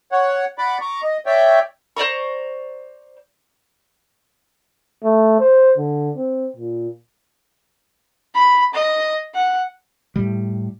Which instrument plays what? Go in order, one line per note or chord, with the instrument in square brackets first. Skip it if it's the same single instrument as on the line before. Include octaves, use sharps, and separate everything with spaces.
[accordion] C#5 F#5
D5 F#5 B5 D6
A#5 C#6 D6
D#5
C#5 D5 E5 G5
[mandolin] C5 D5 A#5 C#6
[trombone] A3
C5
D3
C4
A#2
[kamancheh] B5
D#5
F#5
[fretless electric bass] A2 G3